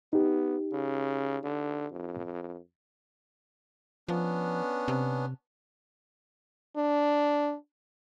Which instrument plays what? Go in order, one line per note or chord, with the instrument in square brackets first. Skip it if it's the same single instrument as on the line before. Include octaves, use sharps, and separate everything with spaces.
[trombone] B3 [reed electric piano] D#4 G4
[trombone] C#3
D3
F2
[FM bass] F3 [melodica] B3 C#4 D4
[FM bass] C3
[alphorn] D4